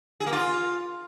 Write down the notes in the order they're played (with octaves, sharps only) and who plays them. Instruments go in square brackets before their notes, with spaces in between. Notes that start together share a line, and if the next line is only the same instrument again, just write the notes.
[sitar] G#4
A#3
F4